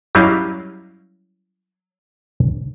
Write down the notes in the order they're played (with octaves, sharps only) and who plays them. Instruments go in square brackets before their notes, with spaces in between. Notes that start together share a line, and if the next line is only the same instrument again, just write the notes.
[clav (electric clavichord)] F#3 G3 C#4 E4 D#5 F5